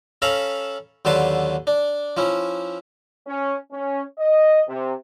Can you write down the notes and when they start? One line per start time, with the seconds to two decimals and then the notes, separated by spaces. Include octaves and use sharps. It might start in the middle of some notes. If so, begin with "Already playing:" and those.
0.22 C#4 A4 E5 F5 A#5 B5
1.05 D#2 D3 F#3 B4 A5 C6
1.67 D4
2.17 F3 C#4 E4
3.27 C#4
3.72 C#4
4.19 D#5
4.68 C3